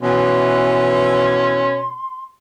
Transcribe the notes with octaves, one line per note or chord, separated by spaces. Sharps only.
B2 E3 C#4 C6